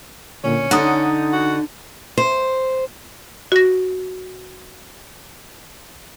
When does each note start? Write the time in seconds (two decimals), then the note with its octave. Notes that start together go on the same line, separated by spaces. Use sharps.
0.44 A#2 D3 C#4
0.71 D3 D#4 F#5 A#5 D#6
1.33 F#4
2.18 C5
3.52 F#4 A#6